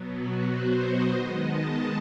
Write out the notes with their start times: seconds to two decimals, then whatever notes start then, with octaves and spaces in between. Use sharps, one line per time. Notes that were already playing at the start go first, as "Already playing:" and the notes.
Already playing: B2 F#3 B3
0.17 F#4
0.49 C5
0.81 D#5
1.13 D#3 G#3 B3 D#5
1.44 A5